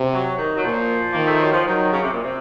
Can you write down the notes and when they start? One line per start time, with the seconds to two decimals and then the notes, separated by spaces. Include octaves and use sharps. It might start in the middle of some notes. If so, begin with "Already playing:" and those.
Already playing: C3
0.13 F#3
0.38 D#3
0.55 F#3
0.63 A#2 F3
1.12 D#3 A#3
1.25 A3
1.39 F#3
1.52 F3
1.65 D#3 F#3
1.92 C#3
2.02 C3
2.13 A#2
2.23 C3